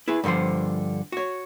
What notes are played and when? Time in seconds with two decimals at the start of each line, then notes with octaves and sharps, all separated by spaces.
0.08 E4 G#4 B4
0.24 G2 D3 D#3 F3 C5
1.12 F#4 C#5